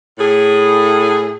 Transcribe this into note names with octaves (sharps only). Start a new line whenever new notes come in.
A2 G#4